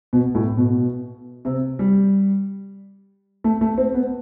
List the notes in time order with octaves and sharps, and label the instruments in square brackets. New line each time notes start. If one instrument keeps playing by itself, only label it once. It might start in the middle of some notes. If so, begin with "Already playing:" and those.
[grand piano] B2
A2
B2
C3
G3
A3
A3
C4
B3